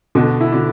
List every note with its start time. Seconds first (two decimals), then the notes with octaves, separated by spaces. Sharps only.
0.15 B2 D3 D4
0.41 E4
0.52 D3 D4